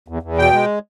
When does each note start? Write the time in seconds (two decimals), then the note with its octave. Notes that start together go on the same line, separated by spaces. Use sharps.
0.08 E2
0.23 E2
0.38 B2 G5
0.53 G#3